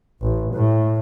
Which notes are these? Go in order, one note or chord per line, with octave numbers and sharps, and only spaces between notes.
A1
A2